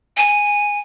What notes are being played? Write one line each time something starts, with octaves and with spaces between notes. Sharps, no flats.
G#5